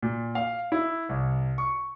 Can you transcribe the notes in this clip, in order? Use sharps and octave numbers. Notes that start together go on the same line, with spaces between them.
A#2
F5
E4
C2
C#6